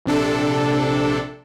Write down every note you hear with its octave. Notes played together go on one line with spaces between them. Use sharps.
A#1 C3 D4 A4